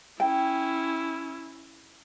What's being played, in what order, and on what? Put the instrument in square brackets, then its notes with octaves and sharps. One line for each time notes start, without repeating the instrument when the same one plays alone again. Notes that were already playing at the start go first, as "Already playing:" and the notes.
[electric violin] C#4 E4 [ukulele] G5